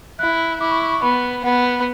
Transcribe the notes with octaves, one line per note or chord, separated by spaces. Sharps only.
E4 F#6
E4 D6
C#6
C#6
C#6
B3 B5
B3 F#5